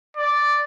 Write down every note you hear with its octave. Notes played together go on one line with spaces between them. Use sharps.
D5